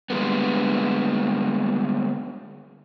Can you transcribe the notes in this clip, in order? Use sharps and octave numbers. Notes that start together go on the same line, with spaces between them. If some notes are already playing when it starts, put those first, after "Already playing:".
D3 G3 G#3 A#3 B3